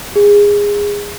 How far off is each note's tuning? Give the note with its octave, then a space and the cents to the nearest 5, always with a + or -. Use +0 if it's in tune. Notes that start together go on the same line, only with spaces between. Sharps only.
G#4 -20